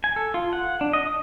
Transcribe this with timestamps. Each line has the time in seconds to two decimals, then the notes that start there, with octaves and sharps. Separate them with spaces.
0.04 G#5
0.16 A4
0.34 F4
0.53 F#5
0.81 D4
0.93 D#5
1.07 D#6